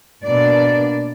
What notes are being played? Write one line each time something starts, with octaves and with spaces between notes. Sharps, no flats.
B2 A#3 D4 D5